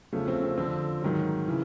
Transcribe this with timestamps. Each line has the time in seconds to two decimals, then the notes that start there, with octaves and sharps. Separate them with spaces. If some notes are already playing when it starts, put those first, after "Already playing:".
0.13 E2 C#3 F3 A3
0.28 C4
0.43 C4
0.58 F2 D3 F3 C4
1.02 G#2 D#3 F#3
1.48 C#3 E3